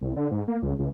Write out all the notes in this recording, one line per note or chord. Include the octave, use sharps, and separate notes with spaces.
C2
D3
G#2
A#3
C#2
C#2